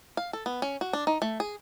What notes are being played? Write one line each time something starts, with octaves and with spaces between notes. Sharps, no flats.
F5
A4
B3
C#4
F#4
D4
D#4
A3
G#4